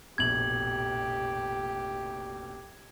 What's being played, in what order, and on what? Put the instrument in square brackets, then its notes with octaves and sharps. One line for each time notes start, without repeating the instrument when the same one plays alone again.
[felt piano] F1 A#1 B2 [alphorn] G4 [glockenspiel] G#6 F#7